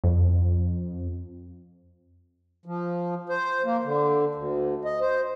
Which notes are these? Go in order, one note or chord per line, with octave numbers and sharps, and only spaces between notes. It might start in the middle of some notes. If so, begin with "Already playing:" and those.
F2
F3
C5
A#3
D3
D2
D#5
C5